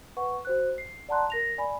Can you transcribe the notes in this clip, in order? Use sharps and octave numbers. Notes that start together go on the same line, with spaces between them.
B4 F#5 C#6
F#4 C5 F#6
C7
D5 F#5 A5 A#5 C6 F#6
A#4 A#6 F7
D5 G#5 B5